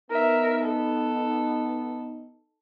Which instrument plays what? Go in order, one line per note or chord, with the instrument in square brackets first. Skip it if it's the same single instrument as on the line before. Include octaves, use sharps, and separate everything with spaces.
[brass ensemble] B3 D#4 [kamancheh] A#4 E5
[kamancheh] A4